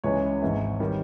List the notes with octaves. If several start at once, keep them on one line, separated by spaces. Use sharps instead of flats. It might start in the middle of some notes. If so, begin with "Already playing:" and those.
C#2 C#3 E3 G#3 C#5
G#1 G#2 E3
D#3 G3